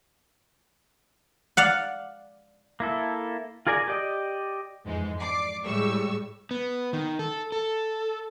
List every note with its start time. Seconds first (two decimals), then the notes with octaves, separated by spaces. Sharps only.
1.57 D5 F5 F#5
2.80 A#3 E4 A4
3.67 F4 G#4 A#4 D5 G#5
3.88 G4 D5 D#5
4.84 F2 G#2 E3 G#3 D#4
5.19 D5 D6 C7
5.64 A2 G3 G#3 C#6 E6
6.51 B3
6.93 D#3
7.19 A4
7.52 A4